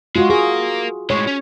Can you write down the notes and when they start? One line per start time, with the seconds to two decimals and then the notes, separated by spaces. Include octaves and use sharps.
0.16 G#3 F4 F#4
0.30 G#4 A#4 F5
1.10 A2 G#3 C#5
1.27 C#4